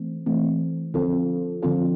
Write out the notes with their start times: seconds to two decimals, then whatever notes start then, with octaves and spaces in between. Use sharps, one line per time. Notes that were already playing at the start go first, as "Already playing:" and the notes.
Already playing: E3 A3 C4
0.26 E3 A3 C4
0.94 D3 F3 C4 F4 A4
1.63 D3 F3 C4 F4 A4